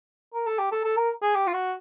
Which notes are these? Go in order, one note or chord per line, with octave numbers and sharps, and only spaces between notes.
A#4
A4
G4
A4
A4
A#4
G#4
G4
F4
F#4